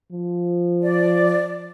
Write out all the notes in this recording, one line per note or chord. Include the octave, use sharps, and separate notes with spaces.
F3
D5